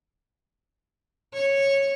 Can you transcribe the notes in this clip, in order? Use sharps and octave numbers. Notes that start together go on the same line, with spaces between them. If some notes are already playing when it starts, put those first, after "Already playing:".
C#5